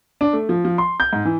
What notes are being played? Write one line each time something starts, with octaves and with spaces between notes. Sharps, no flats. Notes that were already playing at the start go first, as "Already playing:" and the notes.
D4
A3
F3
F3
C6
G6
G#2
E3